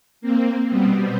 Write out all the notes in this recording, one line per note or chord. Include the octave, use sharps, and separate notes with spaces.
A#3 C4
B2 G3 B3 C4